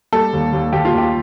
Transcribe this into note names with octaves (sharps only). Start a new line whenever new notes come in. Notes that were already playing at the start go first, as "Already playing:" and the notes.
G3 A4
D#2
D#2
D#2 G4
F4
D#2
G4